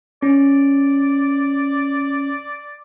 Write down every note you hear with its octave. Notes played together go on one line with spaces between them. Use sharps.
C#4 D5